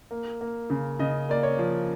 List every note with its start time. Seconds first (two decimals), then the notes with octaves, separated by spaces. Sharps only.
0.11 A#3
0.41 A#3
0.70 C#3
0.99 C#3 D#5
1.29 A#3 D5
1.43 C#5
1.59 F3